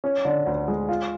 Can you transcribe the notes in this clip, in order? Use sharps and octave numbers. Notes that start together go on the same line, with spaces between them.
C#4
D3
D2
G#3
F4